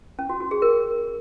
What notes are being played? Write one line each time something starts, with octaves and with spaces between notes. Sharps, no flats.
C#4
F#4
F#4
G#4
A#4